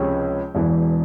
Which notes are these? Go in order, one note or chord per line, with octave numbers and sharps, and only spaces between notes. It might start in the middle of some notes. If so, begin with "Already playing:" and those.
Already playing: C#2 C3 F3 G#3 C#4 G5
E1 E2 E3